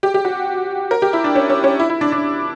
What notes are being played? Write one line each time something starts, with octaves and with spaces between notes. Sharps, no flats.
G4
G4
F#4
A#4
G4
E4
D4
C#4
C#4
C#4
E4
E4
D4
D4